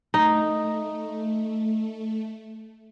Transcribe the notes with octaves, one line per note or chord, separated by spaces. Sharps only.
A3 D#4